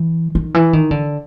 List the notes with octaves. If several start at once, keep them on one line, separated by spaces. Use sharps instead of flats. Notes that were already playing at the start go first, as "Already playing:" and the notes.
Already playing: E3
D#3
E3
D#3
D3